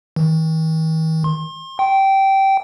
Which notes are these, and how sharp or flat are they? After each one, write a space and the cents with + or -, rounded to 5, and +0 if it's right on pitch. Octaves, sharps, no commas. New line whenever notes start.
D#3 +45
C6 +35
G5 -15